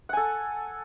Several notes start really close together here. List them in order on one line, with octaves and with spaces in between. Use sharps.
F#5 G#5 A4